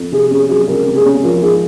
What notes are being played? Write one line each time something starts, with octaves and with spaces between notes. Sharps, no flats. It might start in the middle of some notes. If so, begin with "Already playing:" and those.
Already playing: F2
C3 G#4
C#4 G#4
F#3 G#4
C#2 A#4
C3
G#4
C#4
F3 A#4
G#2 G#4